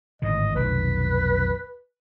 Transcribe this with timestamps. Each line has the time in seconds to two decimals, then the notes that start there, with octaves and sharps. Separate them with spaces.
0.22 G#1 A2 D3 D#5
0.56 F1 B1 D#3 B4